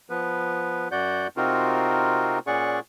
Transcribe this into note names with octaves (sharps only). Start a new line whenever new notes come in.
F3 B3 B4
F#2 F#4 D5 F#5 G6
C3 C4 D#4 F4 F#4 A#4
A#2 C#4 G#4 D5 F#5 C#6